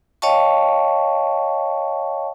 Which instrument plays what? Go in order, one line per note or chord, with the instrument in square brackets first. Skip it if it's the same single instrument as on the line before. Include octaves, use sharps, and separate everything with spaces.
[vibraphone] C#5 D#5 F5 G5 A5 C#6